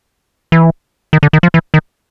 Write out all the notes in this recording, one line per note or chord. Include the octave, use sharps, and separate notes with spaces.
E3
D#3
D3
D#3
F3
E3
D#3